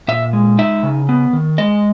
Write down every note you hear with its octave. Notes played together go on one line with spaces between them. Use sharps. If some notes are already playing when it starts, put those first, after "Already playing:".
A#2 E5
G#3
D#4 E5
C#3
B3
D#3
G#3 D#5